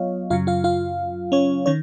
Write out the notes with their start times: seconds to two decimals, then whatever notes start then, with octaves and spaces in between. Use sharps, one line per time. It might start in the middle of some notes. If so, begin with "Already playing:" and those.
Already playing: F#3 B3 F4 C#5 D#5 F5
0.30 F#2 C#3 F#3 F4 F5
0.47 F4 F5
0.64 F4 F5
1.32 C#4 C#5
1.66 D#3 C#4 C#5